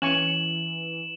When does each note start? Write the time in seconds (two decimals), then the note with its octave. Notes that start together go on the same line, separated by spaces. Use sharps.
0.02 E3 C#4 G#5 C#6 E7 F#7